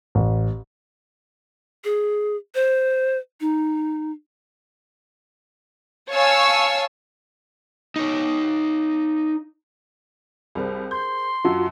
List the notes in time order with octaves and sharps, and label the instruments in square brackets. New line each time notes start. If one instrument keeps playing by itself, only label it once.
[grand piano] A1
[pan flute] G#4
C5
D#4
[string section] C#5 F5 G#5 A5 C#6 E6
[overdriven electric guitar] D#4 C#5
[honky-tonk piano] C2 G3 [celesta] G#4 A#4 C5
[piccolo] C6 [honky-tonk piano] G6
[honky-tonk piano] F#2 [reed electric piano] F4 F#4 [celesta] F#5 A5 E6